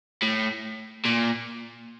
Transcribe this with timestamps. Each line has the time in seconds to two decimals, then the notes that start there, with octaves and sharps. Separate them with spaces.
0.23 A2
1.05 A#2